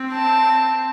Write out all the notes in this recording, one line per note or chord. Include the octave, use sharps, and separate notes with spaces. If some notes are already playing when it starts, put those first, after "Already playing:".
Already playing: C4
A5